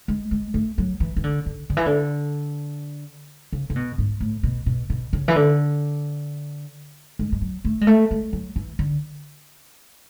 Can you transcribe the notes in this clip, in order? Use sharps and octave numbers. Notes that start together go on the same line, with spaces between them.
G#3
G#3
A3
F#3
E3
E3
D3
D3
D3
E3
D3
C#3
C#3
B2
G#2
A2
B2
B2
B2
C#3
E3
D3
G#3
G#3
F#3
A3
G#3
A3
G#3
F#3
E3
D3